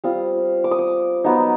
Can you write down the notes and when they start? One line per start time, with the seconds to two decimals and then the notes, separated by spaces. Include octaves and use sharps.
0.04 G3 C4 F4 D#6
0.64 D6
0.71 D#6
0.79 D6
1.24 F#3 B3 D#4